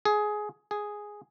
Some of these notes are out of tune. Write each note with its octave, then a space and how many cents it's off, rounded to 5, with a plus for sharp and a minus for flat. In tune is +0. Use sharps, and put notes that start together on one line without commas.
G#4 +15
G#4 +0